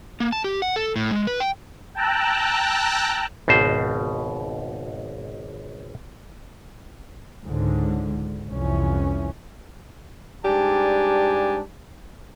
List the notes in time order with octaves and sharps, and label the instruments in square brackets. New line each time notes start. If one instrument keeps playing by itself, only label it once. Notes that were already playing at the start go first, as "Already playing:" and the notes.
[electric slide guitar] A#3
A5
G4
F#5
A4
A2
G#3
B4
G5
[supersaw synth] G5 A5 A#5 E6 F#6
[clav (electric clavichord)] G#1 C#2 B2 C5
[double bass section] C#2 G#2 D3
C2 F2 E3 C#4
[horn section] G#2 G3 D4 G4 G#5 A5